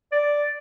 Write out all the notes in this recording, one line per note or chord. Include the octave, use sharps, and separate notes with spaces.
D5